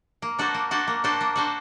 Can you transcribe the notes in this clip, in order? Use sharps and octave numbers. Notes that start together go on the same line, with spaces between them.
A#3
D4 F#4 A4 C5
A#3
D4 F#4 A4 C5
A#3
D4 F#4 A4 C5
A#3
D4 F#4 A4 C5